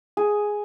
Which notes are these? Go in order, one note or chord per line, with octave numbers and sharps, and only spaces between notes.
G#4